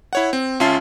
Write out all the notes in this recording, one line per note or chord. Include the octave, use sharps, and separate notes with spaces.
E4 C#5 F#5
C4
C#2 C#4 F4 E5 A5 C7